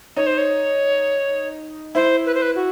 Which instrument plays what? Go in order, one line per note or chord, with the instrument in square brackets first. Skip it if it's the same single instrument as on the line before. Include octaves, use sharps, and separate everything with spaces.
[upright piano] D#4 [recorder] C#5
[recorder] C5
C#5
[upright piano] E4 [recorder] C5
[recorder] B4
C5
B4
F#4